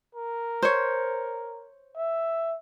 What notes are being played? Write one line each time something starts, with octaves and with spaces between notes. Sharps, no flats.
A#4
C5 C#5
E5